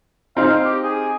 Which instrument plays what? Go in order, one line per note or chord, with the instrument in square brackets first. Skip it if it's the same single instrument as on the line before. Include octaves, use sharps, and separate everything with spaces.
[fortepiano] C4 D#4 [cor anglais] F5
[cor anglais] G4
G#4